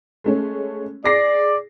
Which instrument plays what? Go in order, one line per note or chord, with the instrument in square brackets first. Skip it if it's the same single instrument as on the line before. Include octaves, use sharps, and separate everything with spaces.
[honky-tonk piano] G#3 A3 C#4
[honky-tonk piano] G#4 A#6 C7 [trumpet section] D5